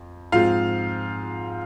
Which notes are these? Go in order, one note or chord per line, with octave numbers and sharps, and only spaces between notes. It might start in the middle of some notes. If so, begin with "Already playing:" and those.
Already playing: F2
G#2 F3 G#3 C4 F4 F5